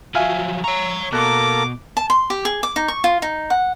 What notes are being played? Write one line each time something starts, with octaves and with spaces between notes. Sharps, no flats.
F3 F#3 E5 F5 G#5
C#5 A#5 C#6
B2 A#3 A4 A#5 D6 F#6
A5
C6
G4
G#4
D6
D#4
C#6
F4
D#4
F#5